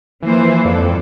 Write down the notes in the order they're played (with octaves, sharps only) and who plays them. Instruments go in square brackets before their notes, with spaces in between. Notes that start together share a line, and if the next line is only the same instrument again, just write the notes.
[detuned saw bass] E3 [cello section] F3 A#3 C5
[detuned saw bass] F2 [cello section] G#2 A4 D5